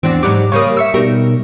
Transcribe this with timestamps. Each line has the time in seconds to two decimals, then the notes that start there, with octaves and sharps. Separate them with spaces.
0.03 E2 C4 D4 F#4
0.23 G#2 F#3 G3 D6
0.52 C#3 G3 A#3 C#5 D#6
0.77 E5 C#6 E6
0.94 B2 G3 D#4 A#4